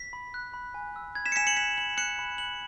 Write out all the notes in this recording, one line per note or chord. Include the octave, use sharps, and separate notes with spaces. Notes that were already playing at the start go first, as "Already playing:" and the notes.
Already playing: B6
B5
F#6
B5
G#5
E6
B5 G#6
B6 E7
C#7
G#5 B6 E7
C#7 F#7
F#6 B6 E7
B5 C#7 F#7
F#6 C#7 F#7
B5
F#6 C#7 F#7